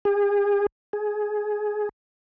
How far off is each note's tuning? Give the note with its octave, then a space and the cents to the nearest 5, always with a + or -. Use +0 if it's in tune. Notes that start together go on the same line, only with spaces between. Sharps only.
G#4 -40
G#4 +15